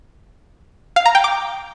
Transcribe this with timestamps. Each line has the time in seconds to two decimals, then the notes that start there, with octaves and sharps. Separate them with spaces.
0.96 F5
1.06 A#5
1.15 G5
1.24 D6